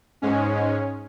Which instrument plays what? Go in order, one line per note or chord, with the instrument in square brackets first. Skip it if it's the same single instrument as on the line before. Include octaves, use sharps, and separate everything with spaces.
[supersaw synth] G#2 G#3 C#4